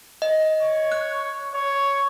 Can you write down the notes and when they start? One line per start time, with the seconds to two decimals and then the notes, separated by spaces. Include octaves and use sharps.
0.22 D#5
0.62 C#5
0.92 F#6
1.55 C#5